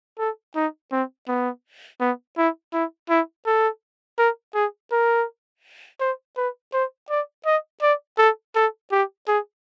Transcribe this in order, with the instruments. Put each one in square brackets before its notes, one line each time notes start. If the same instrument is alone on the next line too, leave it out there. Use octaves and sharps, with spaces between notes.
[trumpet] A4
D#4
C4
B3
B3
E4
E4
E4
A4
A#4
G#4
A#4
C5
B4
C5
D5
D#5
D5
A4
A4
G4
G#4